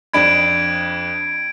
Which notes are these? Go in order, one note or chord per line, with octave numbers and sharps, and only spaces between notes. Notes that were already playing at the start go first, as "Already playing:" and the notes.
F2 D4 B5 G#6 D7